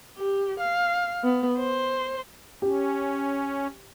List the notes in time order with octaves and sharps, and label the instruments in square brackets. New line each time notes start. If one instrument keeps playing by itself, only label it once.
[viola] G4
F5
B3
C5
[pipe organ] C#4 [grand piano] G4